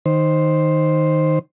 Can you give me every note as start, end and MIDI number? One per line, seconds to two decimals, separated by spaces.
0.06 1.39 51
0.06 1.39 72